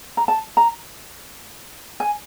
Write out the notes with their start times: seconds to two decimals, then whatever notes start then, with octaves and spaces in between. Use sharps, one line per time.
0.17 A#5
0.28 A5
0.57 A#5
2.00 G#5